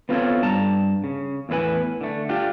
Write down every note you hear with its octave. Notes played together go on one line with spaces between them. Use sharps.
B3 C4 F4 A4 C5 C#5
G2 A5 A#5
C#3
E2 A2 E4 B4 G#5
D3 A3
D4 F4 G4